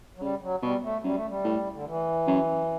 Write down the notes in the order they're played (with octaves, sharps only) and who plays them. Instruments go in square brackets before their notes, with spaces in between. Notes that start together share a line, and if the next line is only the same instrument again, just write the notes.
[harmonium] F#3
[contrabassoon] C#3 [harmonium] G3
[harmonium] F#3
[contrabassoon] B2 [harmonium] G3
[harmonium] A3
[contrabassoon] F#2 [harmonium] G3
[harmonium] A3
G3
[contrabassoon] A2
[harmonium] D3
E3
[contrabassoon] F#2